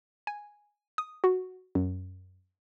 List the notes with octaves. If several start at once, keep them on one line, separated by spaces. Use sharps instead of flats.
G#5
D#6
F#4
F#2